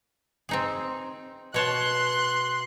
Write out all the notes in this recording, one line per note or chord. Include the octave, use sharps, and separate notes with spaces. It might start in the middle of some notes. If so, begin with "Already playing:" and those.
C4 D#4 G#4
B2 C#5 A5 C6 F#6